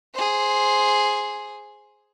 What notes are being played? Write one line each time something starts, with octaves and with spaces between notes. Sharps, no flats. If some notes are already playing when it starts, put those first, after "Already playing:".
G#4 C5